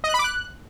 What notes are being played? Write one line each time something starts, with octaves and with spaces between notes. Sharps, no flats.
D#5
F#6
B5
D6
F#6